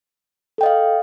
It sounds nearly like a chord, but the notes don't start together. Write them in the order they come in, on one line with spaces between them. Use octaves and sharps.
A4 G5 D#5 F5